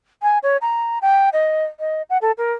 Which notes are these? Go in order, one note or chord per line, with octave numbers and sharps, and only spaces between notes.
G#5
C#5
A#5
G5
D#5
D#5
F#5
A4
A#4